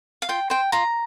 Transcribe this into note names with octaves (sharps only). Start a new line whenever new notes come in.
F5
F4 G5
C5 G5
F4 A#5